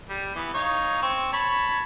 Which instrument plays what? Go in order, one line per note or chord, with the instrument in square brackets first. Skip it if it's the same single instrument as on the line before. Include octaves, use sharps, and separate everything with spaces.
[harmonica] G3
E3 B3
D#4 C#5 F5
C4 C#6
C#5 A5 B5